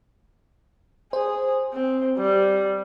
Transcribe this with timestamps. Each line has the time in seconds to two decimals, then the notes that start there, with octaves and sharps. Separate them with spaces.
1.13 G#4 C5
1.73 C4
2.18 G3